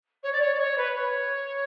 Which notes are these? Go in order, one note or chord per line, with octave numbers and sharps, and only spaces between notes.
C#5
D5
C#5
D5
C#5
B4
C#5